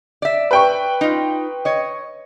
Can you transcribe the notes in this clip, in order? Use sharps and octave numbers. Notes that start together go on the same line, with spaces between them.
D5 E5
B4 G5 C#6
D#4 F4
C#5 D#5